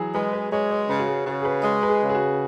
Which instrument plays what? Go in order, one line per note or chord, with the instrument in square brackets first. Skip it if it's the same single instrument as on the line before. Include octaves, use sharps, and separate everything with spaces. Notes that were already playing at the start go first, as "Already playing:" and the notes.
Already playing: [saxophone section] E3 [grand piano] F#3 G#4
[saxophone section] G#3 [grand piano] B4
[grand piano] B4
[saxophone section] G#3 [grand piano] C#5
[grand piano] C#5
[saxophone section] C#3 [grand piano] B4
[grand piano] F#4
G#4
[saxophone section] C#3 [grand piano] F#4
[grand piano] G#4
B4
[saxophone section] G#3
[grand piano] B4
G#4
[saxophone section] C#3
[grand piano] G#4
F#4